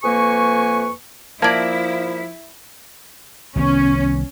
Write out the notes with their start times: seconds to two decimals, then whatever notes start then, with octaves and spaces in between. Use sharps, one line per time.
0.03 F2 A#3 B4 G#5 C#6
1.42 F3 A#3 E4 D5 A5 G#6
3.56 C2 D#3 B3 C#4